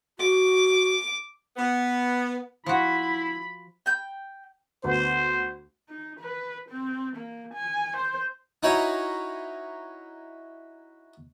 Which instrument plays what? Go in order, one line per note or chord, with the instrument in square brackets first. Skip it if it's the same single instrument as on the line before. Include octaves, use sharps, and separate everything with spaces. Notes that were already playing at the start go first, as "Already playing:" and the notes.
[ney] F#4 [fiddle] D6
[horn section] B3
[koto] F3 F#4 [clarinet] E4 [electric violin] B5
[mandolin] G5 G6
[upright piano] D2 B3 [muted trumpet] C5
[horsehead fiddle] D#4
B4
C4
A#3
G#5
C5
[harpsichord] D#4 E4 F#4 C#5 G#5 A#5